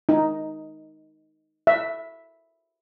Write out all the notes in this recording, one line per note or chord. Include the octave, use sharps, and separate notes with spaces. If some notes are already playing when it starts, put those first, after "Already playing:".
D#4
E5